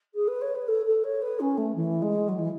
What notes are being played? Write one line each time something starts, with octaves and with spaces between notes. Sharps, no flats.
G#4
B4
C#5
B4
A4
A4
C#5
B4
C#4
A3
E3
G#3
F#3
E3